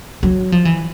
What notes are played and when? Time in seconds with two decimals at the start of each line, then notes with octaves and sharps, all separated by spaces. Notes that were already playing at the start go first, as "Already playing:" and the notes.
0.23 F#3
0.52 F3
0.65 E3